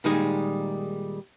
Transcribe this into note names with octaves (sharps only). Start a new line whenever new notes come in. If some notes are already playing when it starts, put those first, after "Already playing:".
A#2 D#3 G3 G#3 D#4 G#4